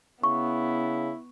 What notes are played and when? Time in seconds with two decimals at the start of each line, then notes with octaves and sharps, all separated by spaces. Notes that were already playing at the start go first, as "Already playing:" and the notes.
0.24 C#3 B3 E4 C#6